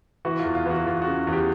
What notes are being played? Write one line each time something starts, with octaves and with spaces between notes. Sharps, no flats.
E3 F#4
E2 F4
F4
E3 F#4
E2 F4
C#3 F#4
E2
G4